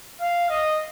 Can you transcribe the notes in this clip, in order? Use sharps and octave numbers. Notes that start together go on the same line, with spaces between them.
F5
D#5